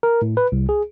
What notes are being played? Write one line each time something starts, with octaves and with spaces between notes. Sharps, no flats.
A#4
A2
B4
C2
G#4